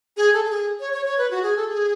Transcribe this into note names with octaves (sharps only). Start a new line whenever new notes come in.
G#4
A4
A4
G#4
C#5
C#5
C#5
B4
F#4
G#4
A4
G#4